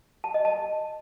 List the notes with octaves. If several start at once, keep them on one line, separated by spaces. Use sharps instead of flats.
A5
D#5
A5